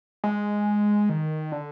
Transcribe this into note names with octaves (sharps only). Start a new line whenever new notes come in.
G#3
D#3
D3